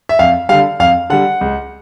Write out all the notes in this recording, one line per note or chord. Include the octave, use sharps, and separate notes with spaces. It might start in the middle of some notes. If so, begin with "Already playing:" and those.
E5
F2 F5
D3 G3 F5
F2 F5
D3 G3 F#5
C#2